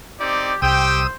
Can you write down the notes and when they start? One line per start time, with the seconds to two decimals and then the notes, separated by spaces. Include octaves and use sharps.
0.20 C4 D#4 G4 D5
0.62 C2 G4 C5 G5 D#6 E6